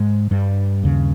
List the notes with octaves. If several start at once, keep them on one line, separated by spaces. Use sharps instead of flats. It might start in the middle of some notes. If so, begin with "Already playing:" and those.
Already playing: G#2 G#3
G2 G3
D#2 C#3